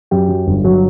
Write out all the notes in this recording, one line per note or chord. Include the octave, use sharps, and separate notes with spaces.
F#2 G4
F#3
G1
F#3